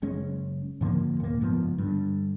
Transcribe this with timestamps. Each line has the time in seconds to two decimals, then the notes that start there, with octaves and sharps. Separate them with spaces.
0.02 F#1 G#3 C#4
0.81 G#2 D3 F3 A#3
1.20 D#1 A#3
1.41 F#1 G#2 F3 B3
1.78 G2 D3